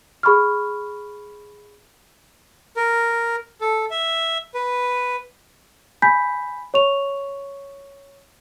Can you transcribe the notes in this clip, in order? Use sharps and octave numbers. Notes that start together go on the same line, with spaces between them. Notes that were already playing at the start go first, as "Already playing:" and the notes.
G#4 B5 C#6 F6
A#4
A4
E5
B4
G#5 B5 G6 B6
C#5 C#6 F7